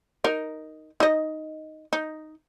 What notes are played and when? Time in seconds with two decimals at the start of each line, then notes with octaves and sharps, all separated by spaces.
0.24 D#4 A#4
1.00 D#4 D#5
1.93 D#4